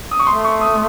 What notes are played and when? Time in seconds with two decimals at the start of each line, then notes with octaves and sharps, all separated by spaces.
0.11 D#6
0.20 C#6
0.27 A3 C6
0.44 C#6
0.61 D#6